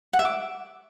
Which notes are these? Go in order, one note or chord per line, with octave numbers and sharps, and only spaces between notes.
F#5
E5
D6